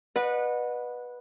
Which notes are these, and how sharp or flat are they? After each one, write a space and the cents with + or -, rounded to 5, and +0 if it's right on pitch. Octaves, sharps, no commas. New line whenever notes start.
B4 -10 D#5 -40 F#5 -20